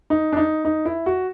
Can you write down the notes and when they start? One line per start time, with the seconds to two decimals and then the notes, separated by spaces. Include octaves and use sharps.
0.10 D#4
0.32 D4
0.37 D#4
0.65 D#4
0.85 E4
1.06 F#4